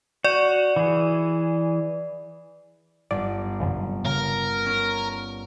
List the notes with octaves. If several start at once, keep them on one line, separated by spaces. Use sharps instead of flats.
F#4 D5
E3 G#4
G1 D5
C2 F#2 D3
C#3 A#4
C#4